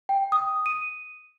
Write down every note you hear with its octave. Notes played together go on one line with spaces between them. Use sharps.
G5
D#6
D#7